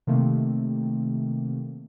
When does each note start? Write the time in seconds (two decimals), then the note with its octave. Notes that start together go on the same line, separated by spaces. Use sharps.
0.07 C3 D#3 A3 A#3 C4